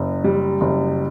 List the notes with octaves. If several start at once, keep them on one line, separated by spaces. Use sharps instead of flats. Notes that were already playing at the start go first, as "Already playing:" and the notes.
Already playing: F#1
G3
F#1